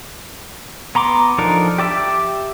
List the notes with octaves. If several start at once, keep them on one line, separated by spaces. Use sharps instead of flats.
B3 A#5 C6 D6
F3 D4 D#4 A4 A#4
G4 D5 E5